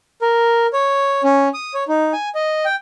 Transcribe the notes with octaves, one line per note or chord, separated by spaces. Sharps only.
A#4
C#5
C#4
D#6
C#5
D#4
G#5
D#5
G5